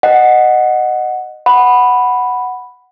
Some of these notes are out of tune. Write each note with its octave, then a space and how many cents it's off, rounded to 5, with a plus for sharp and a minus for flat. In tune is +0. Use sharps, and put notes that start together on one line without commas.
D#5 -15 F#5 +0
F#5 +0 B5 +0